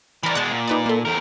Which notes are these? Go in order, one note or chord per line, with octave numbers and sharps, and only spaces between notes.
E3 A#4 D5 B5
B2 G#3 F#5 A5
A#2
D#4 B4 D5
A#3 A4
E2 A#4